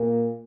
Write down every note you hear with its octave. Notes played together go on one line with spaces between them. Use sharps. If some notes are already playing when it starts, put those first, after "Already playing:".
Already playing: A#2